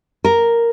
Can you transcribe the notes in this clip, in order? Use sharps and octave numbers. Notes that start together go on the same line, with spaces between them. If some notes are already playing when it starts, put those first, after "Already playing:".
A#4